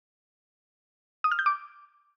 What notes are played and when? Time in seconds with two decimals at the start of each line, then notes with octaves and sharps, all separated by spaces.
1.24 D#6
1.31 F6
1.39 G6
1.46 D6